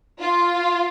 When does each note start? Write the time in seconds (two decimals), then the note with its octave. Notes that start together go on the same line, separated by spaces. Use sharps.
0.21 F4